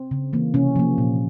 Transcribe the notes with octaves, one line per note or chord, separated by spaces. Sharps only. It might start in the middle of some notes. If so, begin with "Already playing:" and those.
Already playing: C4
C#3
E3 A#3
C3 C#4
F3 A#3
A#2